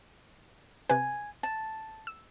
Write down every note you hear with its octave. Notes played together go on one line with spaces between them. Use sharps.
C3 B4 G#5
A5
E6